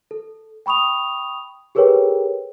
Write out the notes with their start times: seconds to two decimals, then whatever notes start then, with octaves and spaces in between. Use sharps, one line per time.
0.11 A4
0.66 G5 B5 C#6 D#6 F7
1.75 G4 G#4 A#4 B4 C#5 G5